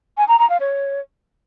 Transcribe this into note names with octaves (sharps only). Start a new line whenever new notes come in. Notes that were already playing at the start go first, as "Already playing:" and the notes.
G#5
A#5
A#5
F5
C#5